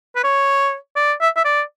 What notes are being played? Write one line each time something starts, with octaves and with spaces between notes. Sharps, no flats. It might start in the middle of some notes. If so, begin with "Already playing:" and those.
B4
C#5
D5
E5
E5
D5